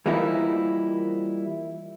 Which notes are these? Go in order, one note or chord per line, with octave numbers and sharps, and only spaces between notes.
E3 F3 G3 A#3 D#4 E4